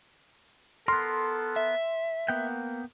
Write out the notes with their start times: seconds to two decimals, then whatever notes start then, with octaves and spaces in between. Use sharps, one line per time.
0.88 B3 A4 A#4 C6
1.56 E5
2.28 A#3 B3 F#5 G5